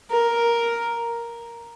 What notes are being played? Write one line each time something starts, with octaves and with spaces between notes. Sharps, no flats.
A#4